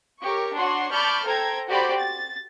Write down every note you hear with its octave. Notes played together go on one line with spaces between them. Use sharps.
G4 A#4 C#5 C#6
D4 F#4 C#5 F#5 C6
D5 A5 B5 C#6 F6 G6
A4 C5 G5 A#5 G#6
F#4 G4 C5 D5 G5 B5
A6